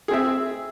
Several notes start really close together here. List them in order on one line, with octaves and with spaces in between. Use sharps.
G#4 C4 E5